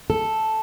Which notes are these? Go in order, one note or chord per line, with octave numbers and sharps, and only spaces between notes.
A4